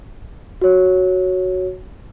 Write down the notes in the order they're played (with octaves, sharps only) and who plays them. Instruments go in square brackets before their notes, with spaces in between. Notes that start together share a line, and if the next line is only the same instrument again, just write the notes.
[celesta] F#4 C#5